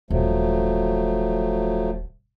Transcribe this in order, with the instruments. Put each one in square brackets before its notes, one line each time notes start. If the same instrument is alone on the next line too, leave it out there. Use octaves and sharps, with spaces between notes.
[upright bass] D#1 [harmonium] F3 F#3 A3